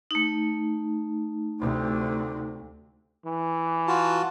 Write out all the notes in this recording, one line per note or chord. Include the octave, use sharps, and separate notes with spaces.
A3 D#4
D2 C3
E3
F4 F#4 A5